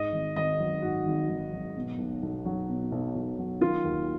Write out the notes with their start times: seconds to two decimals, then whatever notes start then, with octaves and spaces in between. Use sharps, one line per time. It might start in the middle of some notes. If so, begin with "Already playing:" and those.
Already playing: G#2 D#5
0.12 G#1
0.36 G#1 D#5
0.60 F#3
0.82 G#2 F#4
1.06 G#1
1.29 G#1
1.53 F#3
1.76 B2
1.98 B1
2.22 B1
2.45 F#3
2.68 B2
2.92 B1
3.15 B1
3.38 F#3
3.61 D#3 F4
3.84 D#2